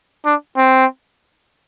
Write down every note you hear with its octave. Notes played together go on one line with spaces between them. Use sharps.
D4
C4